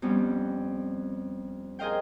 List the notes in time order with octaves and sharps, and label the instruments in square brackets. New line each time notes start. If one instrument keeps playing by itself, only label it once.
[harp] F2 G3 B3 C#4
G#4 A#4 C5 D#5 F5 G5